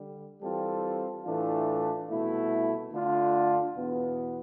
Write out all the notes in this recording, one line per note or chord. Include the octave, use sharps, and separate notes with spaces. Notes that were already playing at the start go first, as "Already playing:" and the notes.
Already playing: D3 G3
E3 G3 C4 F4 A4
A2 E3 A3 D4 F4
C2 B2 A3 E4
D3 A3 D4 F4
E2 B2 B3